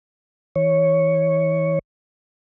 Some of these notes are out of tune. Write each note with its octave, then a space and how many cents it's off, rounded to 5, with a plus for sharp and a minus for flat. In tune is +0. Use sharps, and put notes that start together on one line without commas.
E3 -30 C#5 +0